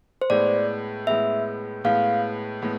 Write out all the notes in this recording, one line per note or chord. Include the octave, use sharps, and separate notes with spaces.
C5
A2 G#3 B3 D5
A2 G#3 B3 E5
A2 G#3 B3 F5
A2 G#3 B3